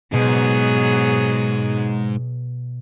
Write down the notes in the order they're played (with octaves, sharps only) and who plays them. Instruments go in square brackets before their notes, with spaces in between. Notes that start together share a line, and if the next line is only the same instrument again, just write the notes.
[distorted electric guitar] G#2 [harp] B2 [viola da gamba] F#3 B3 G#4